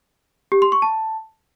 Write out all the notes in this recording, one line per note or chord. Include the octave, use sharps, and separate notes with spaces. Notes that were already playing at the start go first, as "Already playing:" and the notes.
G4
C6
C#6
A5